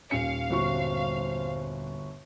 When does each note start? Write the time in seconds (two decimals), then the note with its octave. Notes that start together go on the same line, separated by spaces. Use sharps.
0.11 D#1 C#4 F5 C#7
0.51 G1 F#4 C5 C#6